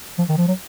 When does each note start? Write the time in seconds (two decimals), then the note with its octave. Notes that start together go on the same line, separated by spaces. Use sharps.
0.19 F3
0.29 D#3
0.38 F3
0.48 F#3